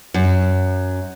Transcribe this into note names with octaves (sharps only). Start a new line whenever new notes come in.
F#2